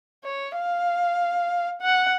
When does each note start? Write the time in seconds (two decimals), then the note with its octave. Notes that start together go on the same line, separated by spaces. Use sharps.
0.24 C#5
0.56 F5
1.81 F#5